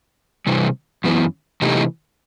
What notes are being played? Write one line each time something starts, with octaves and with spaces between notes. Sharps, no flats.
C3 E3 G3
F#2 E3 B3
C3 E3 A3 D#4 G4